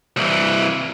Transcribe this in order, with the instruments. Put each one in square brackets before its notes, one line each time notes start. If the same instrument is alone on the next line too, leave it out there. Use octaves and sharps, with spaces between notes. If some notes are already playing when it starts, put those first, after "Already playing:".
[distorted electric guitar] C2 E3